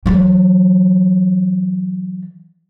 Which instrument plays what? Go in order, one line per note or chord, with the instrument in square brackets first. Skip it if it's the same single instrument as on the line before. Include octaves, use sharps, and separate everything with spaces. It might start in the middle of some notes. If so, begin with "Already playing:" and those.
[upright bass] E3 F#3